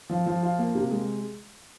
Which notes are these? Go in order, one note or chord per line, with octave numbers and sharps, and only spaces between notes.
F3
F3
F4
A#3
C3
G#3